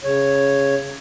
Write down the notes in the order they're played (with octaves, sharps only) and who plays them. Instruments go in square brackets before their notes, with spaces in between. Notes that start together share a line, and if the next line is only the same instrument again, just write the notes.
[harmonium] C#3 C#5